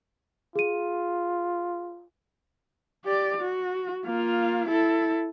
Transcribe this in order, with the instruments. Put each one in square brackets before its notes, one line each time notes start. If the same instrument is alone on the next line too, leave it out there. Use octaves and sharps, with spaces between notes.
[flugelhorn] F4 [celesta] G#4 D#7
[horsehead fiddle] G4 D5
F#4
A#3 F4
E4 A4